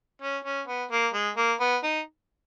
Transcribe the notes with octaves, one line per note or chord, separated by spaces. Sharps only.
C#4
C#4
B3
A#3
G#3
A#3
B3
D#4